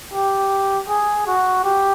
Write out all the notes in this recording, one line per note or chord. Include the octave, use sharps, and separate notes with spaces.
G4
G#4
F#4
G4